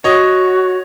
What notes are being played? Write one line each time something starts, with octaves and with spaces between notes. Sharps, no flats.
F#4 C#5 D#5